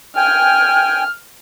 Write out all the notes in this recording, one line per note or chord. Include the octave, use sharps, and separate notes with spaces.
G5 G#5 F6